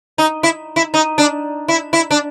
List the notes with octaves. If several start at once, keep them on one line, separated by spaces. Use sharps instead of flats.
D#4
E4
E4
D#4
D4
E4
E4
D4